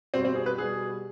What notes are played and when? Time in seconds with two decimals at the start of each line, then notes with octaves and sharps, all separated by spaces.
0.14 B2 G3 C4
0.25 C4
0.35 G#4
0.46 B4
0.58 B2 G3 G#4